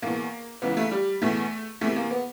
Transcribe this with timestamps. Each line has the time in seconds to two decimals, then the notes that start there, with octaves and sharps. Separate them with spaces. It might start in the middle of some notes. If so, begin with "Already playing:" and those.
0.02 E2 B2 A#3
0.62 C#2 C#3 E3 B3
0.77 A3
0.91 G3
1.22 E2 B2 A3
1.81 E2 C3 E3 A3
1.96 A#3
2.11 B3